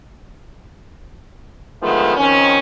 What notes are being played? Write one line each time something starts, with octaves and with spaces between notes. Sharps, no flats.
D3 D#3 F3 G#3 A3 B3
F2 D#3 C#4